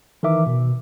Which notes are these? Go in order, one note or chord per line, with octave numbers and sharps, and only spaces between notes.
D#3 E3 A#4 E5 D6
B2